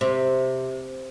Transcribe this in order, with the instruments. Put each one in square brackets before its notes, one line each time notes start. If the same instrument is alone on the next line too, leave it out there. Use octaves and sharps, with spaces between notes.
[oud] C3